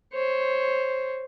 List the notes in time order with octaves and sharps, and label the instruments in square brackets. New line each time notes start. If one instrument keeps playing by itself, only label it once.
[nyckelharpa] C5 C#5